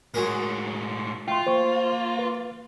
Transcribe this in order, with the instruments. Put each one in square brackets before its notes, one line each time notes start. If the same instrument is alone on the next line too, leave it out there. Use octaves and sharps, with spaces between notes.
[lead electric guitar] A2 G#3 [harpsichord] F#3 G#4 A#4
[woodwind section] A3 [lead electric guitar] F4 [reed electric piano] G5 C6
[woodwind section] A#3 [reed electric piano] C5 C#6
[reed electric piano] B4